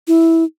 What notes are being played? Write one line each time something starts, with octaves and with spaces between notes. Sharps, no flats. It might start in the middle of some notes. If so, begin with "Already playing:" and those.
E4